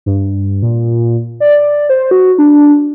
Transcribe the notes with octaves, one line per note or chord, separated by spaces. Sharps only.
G2
A#2
D5
C5
F#4
D4